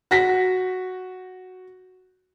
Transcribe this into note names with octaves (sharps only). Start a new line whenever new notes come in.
F#4 A#6 B6